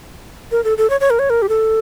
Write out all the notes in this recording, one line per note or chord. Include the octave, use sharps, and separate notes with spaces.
A#4
A4
A4
C#5
C#5
A#4
C#5
A#4
G4
A4